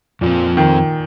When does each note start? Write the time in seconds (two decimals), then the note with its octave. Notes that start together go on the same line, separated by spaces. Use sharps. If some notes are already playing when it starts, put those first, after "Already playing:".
0.21 F2 A#2 F3 C4
0.57 D#3